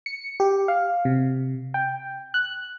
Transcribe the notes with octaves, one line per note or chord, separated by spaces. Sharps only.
C#7
G4
F5
C3
G5
F#6